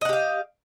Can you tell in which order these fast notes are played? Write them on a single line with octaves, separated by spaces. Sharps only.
D#5 F#5 G4 F5